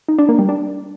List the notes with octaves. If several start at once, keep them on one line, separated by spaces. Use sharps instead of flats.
D#4
D4
A#3
G3
D4